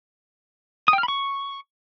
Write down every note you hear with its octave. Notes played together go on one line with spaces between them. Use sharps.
D#6
G5
F6
B5
C#6